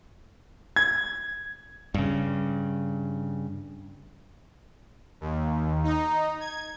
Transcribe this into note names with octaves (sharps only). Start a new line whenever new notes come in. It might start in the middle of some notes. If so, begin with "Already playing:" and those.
G#6
G2 C#3
D#2
D#4
G#6